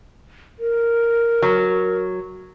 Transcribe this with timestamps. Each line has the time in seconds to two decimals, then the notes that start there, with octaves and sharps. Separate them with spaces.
0.59 A#4
1.42 F#3